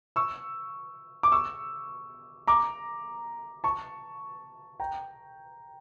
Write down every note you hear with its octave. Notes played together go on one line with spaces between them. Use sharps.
C#6 E6
D6
C#6 E6
A#5 D6
A5 C#6
G5 A#5